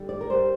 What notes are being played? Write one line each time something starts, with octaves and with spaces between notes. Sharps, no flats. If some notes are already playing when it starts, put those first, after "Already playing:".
Already playing: D3 G3
D5
A#4
G3 C5